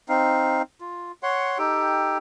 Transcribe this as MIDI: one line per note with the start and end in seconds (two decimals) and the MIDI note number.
0.09 0.62 60
0.09 0.62 63
0.09 0.62 77
0.81 1.12 65
1.23 1.58 73
1.23 1.58 78
1.23 1.58 84
1.59 2.18 63
1.59 2.18 67
1.59 2.18 69
1.59 2.18 79